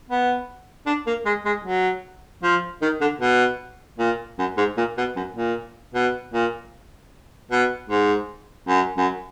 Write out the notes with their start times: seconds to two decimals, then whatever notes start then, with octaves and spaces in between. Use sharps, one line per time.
0.09 B3
0.87 D4
1.07 A#3
1.26 G#3
1.45 G#3
1.65 F#3
2.43 F3
2.82 D#3
3.01 D3
3.21 B2
3.99 A#2
4.39 F#2
4.57 G#2
4.77 A#2
4.98 B2
5.16 F#2
5.36 A#2
5.94 B2
6.34 A#2
7.51 B2
7.90 G#2
8.68 F#2
8.98 F#2